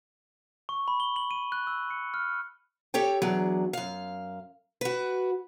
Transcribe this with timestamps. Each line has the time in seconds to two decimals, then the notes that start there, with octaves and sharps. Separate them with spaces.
0.69 C#6
0.88 B5
1.00 G7
1.16 F#7
1.31 D#7
1.52 F#6
1.67 E6
1.90 C#7
2.14 F6
2.94 G4 A4 C#5 G5
3.22 E2 F#3 D4 G#4
3.73 F#2 F5
4.81 F#4 B4